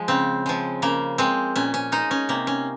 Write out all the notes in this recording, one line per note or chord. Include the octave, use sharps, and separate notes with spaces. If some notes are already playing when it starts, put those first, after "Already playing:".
Already playing: F3 G#3
C#3 C4
F3 G#3
C#3 A#3
G#3 C4
A#2 C#4
C#4
G#3 D#4
C#4
C3 A#3
C#4